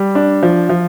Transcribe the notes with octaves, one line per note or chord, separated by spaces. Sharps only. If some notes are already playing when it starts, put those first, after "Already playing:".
Already playing: G3
D4
F3
F3